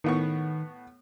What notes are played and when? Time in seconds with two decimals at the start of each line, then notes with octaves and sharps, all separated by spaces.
0.04 A2 D#3 B3 C#6